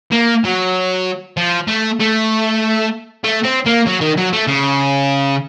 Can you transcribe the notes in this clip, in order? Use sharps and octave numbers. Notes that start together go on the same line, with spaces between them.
A#3
F#3
F3
A3
A3
A3
C4
A#3
F#3
D#3
F#3
A3
C#3